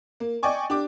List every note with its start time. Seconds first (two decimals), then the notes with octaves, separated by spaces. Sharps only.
0.20 A#3
0.43 D5 D#5 G5 G#5 C#6 D6
0.70 D4 G4 D6